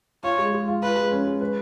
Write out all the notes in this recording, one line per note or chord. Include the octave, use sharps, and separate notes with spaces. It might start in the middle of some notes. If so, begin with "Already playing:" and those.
F4 C#5
G#3
G#3
F4
F4 B4
G#3
C#4
G#3
B4